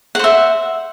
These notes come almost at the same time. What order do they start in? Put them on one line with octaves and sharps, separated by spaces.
F#5 C5 E5